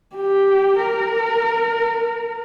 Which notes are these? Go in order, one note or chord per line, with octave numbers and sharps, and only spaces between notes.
G4
A#4